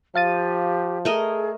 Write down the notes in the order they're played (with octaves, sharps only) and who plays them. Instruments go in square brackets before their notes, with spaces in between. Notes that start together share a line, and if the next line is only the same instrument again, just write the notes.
[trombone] F3 [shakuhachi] G4 [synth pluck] F5 A6 D#7
[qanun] A3 A#4 D#5 [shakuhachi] G#4